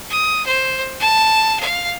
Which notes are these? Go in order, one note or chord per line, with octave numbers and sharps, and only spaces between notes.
D#6
C5
A5
F5